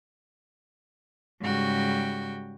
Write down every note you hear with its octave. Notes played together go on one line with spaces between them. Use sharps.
G#2 C#3 G3 F#4 G5